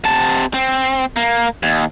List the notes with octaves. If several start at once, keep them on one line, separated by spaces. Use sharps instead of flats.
C3 A5
C4
A#3
D#2